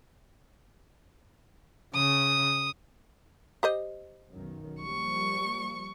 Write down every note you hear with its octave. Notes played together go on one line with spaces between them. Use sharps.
C#3 D#6
G4 C5 D#5
B1 F#2 D#3
F3 G3 A#3 C#6